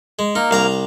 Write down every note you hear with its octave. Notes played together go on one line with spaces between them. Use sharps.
G#3
A#3 D#4 A#4
C2 F5 A#5